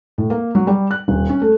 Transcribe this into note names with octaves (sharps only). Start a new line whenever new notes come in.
A2
A#3
F#3
G3
F#6
D#1
C#4
A3